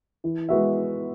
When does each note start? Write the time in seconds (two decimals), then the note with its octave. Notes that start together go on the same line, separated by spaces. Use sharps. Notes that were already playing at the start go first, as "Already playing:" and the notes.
0.24 E3
0.49 G#3 B3 F#4 E5